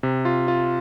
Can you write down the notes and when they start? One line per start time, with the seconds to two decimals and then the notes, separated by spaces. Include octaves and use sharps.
0.03 C3
0.25 F4
0.48 F4